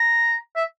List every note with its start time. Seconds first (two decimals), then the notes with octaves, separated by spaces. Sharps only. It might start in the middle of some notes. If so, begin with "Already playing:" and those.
Already playing: A#5
0.56 E5